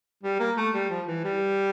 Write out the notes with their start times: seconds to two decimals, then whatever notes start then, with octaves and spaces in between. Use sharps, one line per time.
0.23 G3
0.40 A#3
0.57 A3
0.74 G3
0.90 F3
1.07 E3
1.24 G3